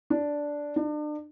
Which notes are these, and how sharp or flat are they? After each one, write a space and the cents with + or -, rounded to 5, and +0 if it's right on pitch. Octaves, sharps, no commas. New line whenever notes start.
D4 -5
D4 +35